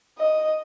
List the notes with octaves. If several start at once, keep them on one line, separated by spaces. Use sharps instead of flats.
D#5